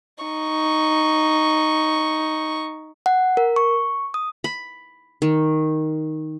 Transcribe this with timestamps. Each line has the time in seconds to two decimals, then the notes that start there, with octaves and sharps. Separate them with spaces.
0.24 D#4 C#6
3.06 F#5
3.37 A#4
3.56 C#6
4.14 D#6
4.44 B5
5.22 D#3